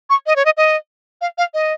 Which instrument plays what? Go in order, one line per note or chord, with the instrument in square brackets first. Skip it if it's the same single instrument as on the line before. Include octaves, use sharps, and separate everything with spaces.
[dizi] C#6
D#5
C#5
D#5
D#5
F5
F5
D#5